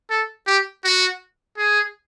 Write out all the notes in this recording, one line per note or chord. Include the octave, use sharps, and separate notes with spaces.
A4
G4
F#4
G#4